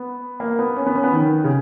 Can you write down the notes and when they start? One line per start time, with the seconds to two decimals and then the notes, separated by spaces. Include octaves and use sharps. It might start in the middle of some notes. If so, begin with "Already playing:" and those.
Already playing: B3
0.40 A#3
0.59 B3
0.77 C#4
0.87 B3
0.95 C#4
1.04 B3
1.13 D#3
1.44 C#3